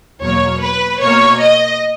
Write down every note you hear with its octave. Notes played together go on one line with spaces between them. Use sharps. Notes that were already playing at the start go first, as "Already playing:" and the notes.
E2 B2 F#3 A#3 C#5
B4
B2 A#3 C#5
D#5